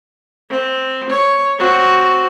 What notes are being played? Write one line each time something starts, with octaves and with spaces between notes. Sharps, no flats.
C4
C#5
C4 F#4